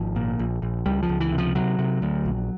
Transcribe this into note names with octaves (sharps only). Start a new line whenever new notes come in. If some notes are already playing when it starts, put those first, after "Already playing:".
Already playing: G#1 F3
A#2
A#1
A#1
C#2 G3
F3
C#2
E3
C3
F3
C3 F#3
C3
D2
A#1